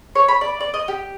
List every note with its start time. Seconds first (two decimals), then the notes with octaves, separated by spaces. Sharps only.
0.15 C#5
0.28 B5
0.41 D5
0.61 D5
0.74 D#5
0.88 G4